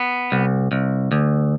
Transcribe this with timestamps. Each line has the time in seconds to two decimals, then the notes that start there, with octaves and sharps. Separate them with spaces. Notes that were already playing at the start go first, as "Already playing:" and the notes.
Already playing: B3
0.32 C2
0.72 C2
1.12 D2